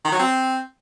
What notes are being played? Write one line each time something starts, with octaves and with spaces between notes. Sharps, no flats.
D#3
F#3
C4